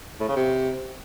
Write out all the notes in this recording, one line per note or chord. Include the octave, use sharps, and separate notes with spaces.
A2
C#3
C3